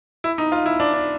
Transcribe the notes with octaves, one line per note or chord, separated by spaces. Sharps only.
E4
D#4
F4
E4
D4
D4